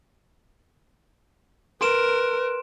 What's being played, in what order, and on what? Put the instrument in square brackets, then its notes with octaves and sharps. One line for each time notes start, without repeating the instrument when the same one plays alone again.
[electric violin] A#4 [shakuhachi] B4 [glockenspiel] C6 D7 E7